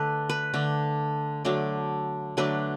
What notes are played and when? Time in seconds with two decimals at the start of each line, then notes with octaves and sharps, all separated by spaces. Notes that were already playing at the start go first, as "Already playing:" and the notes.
Already playing: D3 A3 D4 A4 B4
0.29 B4
0.54 D3 A3 D4
1.45 D3 F#3 A3 D4
2.37 D3 F#3 A3 D4 B4